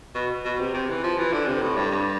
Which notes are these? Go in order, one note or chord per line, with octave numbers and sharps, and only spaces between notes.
B2
B2
C3
C3
E3
F3
E3
D3
C3
A2
G2
G2